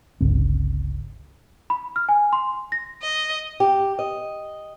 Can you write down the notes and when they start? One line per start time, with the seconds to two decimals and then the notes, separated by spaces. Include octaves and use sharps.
0.21 G1 C#2 C4
1.70 B5
1.96 F6
2.09 G#5
2.33 C6
2.72 A#6
3.02 D#5
3.60 G4
3.99 D#5